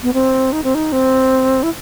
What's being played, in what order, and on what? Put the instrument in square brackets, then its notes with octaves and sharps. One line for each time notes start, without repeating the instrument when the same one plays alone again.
[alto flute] B3
C4
D#4
C4
D#4
C4
E4